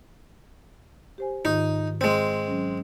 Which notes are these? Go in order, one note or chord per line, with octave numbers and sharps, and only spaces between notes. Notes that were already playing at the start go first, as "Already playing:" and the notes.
G4 C5 G#5
G#2 D#3 D#4 F4
G#3 C4
F#3 C#4